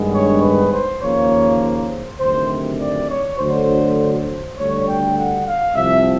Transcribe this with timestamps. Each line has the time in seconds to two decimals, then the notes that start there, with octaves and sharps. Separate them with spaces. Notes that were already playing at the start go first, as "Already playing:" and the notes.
Already playing: G2 D#3 G#3 B3 D4
0.12 C#5
0.41 B4
0.71 C5
1.01 D#2 C#3 F3 A#3 C#5
1.60 C5
2.19 D2 C3 D#3 F#3 C5
2.79 D5
3.08 C#5
3.38 D2 D3 F#3 C5
3.97 C5
4.57 D2 D3 G3 C#5
4.87 G5
5.17 F#5
5.46 F5
5.75 C2 C3 F3 E5